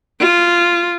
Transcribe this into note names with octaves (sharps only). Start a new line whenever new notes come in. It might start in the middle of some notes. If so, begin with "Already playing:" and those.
F4